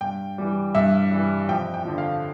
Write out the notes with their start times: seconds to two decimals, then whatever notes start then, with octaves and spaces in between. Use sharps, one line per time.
0.01 G2 G5
0.38 E3 G3
0.75 G2 E5
1.11 E3 G3
1.48 F2 G5
1.74 G5
1.85 D3 F3
1.98 F5